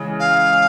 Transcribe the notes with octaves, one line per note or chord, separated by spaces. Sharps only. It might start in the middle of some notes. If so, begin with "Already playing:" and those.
Already playing: C#3 E3 G#3
F5